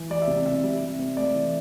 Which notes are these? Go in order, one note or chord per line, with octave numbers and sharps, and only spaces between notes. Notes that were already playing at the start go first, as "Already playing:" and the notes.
Already playing: E3
G3 D5
E5
C3
C3 E5
G3
C3
C4
A3 D5
E3